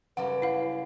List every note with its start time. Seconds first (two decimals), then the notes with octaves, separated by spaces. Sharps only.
0.17 F#2 C#3 G3 B4 F#5
0.42 E4 F5